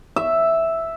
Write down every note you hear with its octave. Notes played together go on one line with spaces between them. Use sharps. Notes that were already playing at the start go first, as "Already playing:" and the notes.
E5